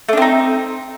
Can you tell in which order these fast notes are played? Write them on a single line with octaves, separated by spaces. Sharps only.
A3 D4 C4 D#4